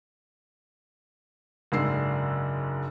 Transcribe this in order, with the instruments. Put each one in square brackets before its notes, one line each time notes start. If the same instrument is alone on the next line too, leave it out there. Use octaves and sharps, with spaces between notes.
[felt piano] F#1 G#2 D3 E6 C7